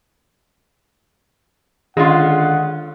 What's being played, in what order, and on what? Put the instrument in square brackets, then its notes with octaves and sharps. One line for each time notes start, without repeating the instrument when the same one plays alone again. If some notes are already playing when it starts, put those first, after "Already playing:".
[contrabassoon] D3 [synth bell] D#3 [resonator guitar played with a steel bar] G#3 C#4 F4 [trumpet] F#5